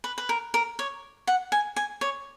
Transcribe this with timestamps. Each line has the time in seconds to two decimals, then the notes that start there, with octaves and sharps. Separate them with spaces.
0.04 B4
0.18 B4
0.29 A#4
0.54 A#4
0.79 C#5
1.27 F#5
1.52 G#5
1.76 G#5
2.01 C#5